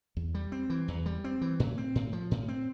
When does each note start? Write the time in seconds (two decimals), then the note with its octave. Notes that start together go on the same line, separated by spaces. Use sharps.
0.17 E2
0.35 G3
0.52 C4
0.70 E3
0.88 E2
1.06 G3
1.24 C4
1.41 E3
1.60 A2
1.78 C4
1.95 A2
2.13 F3
2.31 A2
2.48 C4